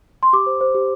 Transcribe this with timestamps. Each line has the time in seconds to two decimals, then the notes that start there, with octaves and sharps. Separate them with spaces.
0.23 C6
0.33 G4 D6
0.46 C5
0.61 C5
0.75 G4